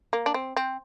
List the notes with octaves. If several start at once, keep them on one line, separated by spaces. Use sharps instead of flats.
A#3
D4
C4
C4